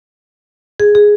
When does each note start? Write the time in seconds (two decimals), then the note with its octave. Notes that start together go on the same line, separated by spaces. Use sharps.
0.80 G#4
0.95 G#4